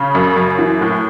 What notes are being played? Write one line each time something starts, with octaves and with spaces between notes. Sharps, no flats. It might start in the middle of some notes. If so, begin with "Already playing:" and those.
Already playing: C#3
F#2
F#2
E3
A2